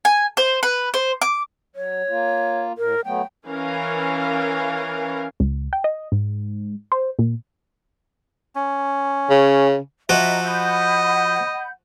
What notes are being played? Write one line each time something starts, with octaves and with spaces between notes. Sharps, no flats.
G#5
C5
B4
C5
D6
F#3 C#5
A#3 F4
A2 A#4
F#3 A3 B3 G5
E3 C#4 A#4 F5
C#2
G5
D#5
G#2
C5
A#2
C#4
C#3
F3 F#4 D#5 E5 A#5
D#5 F#5 B5 G6